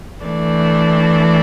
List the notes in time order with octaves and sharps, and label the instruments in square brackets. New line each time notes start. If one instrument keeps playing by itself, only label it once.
[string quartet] E3 A3 D4